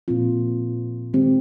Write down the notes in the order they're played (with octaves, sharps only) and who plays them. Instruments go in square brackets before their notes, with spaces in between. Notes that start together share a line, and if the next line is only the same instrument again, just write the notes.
[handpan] A#2 F3 C4 F4
D#3 G#3 C4 G4